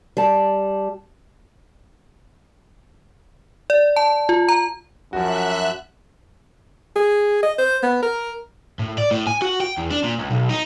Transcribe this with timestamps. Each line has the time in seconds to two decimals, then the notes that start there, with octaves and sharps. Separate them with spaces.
0.17 G3 A5
3.70 D5
3.96 A5
4.29 F4
4.49 A#5
5.13 F#2 F3 F#4 E5 F#6
6.96 G#4
7.43 D#5
7.59 C5
7.83 B3
8.02 A#4
8.79 A2
8.98 D5
9.11 A2
9.27 G#5
9.42 F#4
9.60 G5
9.77 E2
9.90 D4
10.04 A#2
10.19 C#2
10.31 B1
10.50 D#4